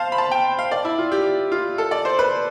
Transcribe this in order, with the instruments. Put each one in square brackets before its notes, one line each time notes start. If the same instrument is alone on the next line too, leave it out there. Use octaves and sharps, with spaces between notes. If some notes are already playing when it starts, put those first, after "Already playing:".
Already playing: [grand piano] C5 F5 A5
B5
A5
G5
F5
D5
E4
F4
G4
F4
A4
D5
C5
B4